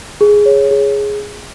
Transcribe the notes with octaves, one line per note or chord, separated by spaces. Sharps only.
G#4
C#5
G#4